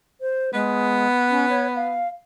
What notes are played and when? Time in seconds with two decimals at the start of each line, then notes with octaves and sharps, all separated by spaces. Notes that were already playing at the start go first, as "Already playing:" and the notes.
0.21 C5
0.53 G#3 B3
1.30 C#4
1.49 C#5
1.76 F5